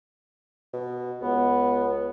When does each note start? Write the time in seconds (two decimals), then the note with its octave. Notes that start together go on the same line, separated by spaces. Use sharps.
0.73 B2
1.21 C#2 B3